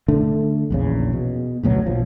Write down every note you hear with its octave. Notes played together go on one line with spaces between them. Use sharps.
D3 A3 D4
A#1 E2 C#3
B2
A1 D2 B2 F#3
A#1 F3